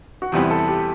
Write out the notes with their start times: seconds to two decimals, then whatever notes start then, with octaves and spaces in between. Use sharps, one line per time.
0.22 F#4
0.32 E2 C3 G3 B3 E4 G4
0.51 A4
0.68 G4